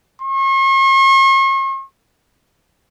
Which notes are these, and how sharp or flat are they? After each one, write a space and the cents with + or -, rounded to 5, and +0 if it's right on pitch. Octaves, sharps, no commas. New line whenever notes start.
C#6 -45